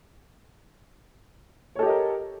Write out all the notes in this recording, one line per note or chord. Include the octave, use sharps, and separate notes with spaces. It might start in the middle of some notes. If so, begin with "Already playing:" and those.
G4 A4 A#4 C#5 D#5